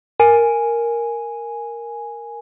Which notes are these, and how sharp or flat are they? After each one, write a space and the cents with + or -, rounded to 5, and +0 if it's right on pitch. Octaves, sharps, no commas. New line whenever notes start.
A#4 +0 G#5 +0